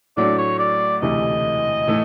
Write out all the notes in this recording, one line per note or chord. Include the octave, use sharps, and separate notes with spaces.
A2 F#3 A3 D4 D5
C#5
D5
E1 D2 C3 E3 A3 D#5
A2 E3 A3